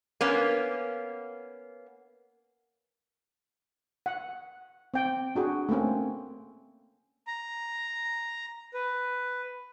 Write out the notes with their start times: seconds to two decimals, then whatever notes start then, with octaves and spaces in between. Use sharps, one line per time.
0.21 A#3 B3 C#4
4.06 F#5
4.94 C4 G5
5.35 D4 F#4 G#4
5.69 A3 A#3 C4 C#4
7.27 A#5
8.74 B4